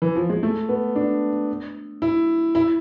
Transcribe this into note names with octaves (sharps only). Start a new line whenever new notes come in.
E3
F3
G#3
A3
B3
D4
E4
E4